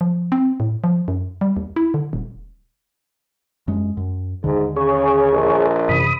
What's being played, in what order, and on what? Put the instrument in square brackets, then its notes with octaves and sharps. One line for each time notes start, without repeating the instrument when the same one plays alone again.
[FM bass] F3
C4
A2
F3
F#2
G3
D#2
E4
D3
D#1
[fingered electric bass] F#2 G#3
F#2
[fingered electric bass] D#2 D3 [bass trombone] G#2
[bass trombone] C#3 [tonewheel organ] G#4 C#5
[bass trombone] A#1
[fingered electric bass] F#2 C3 E3 [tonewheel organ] B5 D#6